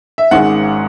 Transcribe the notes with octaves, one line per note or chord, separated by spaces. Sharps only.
E5
G#1 G#2 D#3 G#3 C#4 F#5